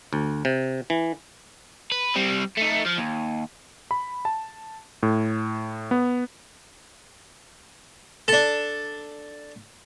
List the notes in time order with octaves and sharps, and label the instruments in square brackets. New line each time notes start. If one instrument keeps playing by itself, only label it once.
[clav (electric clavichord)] D2
C3
E3
[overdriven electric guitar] B4
G3 C4
A3 D#4
F3
D#2
[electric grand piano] B5
A5
A2
B3
[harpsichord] D4 A4